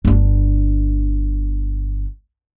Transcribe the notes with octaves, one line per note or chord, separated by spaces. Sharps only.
G1 D4